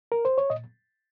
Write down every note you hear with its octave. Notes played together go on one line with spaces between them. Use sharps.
A#4
C5
C#5
A#2 D#5